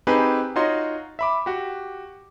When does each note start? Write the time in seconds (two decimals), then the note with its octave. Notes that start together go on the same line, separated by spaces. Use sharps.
0.07 C4 D#4 G4 G#4 B4
0.56 D#4 F4 F#4 C#5 D#5 C6
1.19 E5 B5 D6
1.46 F#4 G4